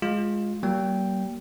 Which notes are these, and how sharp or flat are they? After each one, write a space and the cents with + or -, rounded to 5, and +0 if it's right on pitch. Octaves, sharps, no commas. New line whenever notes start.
G#3 +0 F4 +10
G3 -40 A#3 +10 G5 +0